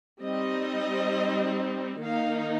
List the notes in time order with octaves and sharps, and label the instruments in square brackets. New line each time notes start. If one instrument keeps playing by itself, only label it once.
[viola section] G3 C4 D#4 D#5
D#3 A#3 D#4 F5